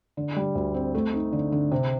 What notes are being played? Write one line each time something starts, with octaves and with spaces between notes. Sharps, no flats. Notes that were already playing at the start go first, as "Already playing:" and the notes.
D3
G3
D2
C4
A3
D#4
D3
D3
C3